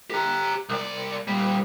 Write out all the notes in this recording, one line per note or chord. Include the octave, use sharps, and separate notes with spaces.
G4 A#5
C2 D5
A#2 G3